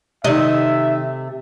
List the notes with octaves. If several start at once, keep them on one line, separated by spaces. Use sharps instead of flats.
C3 D#3 A3 D#5 E5